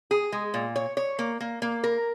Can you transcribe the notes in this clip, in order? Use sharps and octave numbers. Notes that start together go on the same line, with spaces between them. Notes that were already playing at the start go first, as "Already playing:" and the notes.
G#4
G#3
A#2
C#5
C#5
A#3
A#3
A#3
A#4